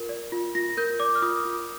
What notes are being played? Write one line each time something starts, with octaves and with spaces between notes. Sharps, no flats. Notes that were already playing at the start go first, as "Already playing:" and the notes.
Already playing: F4 A#4
D5
F4
F4 A#6
A#4 G6
D5 D6
F6
F4 D#6
F4